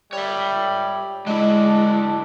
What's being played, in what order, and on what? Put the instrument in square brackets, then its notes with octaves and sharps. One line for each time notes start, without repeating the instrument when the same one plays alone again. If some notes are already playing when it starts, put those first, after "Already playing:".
[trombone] G3 [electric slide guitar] C#5 E5
[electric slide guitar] F#3 E4 [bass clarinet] G#3 [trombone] D4